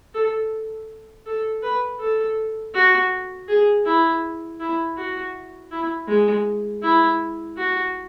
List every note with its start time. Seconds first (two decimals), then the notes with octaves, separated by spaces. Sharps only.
0.14 A4
1.26 A4
1.63 B4
2.00 A4
2.75 F#4
3.48 G#4
3.85 E4
4.60 E4
4.97 F#4
5.71 E4
6.08 G#3
6.83 E4
7.57 F#4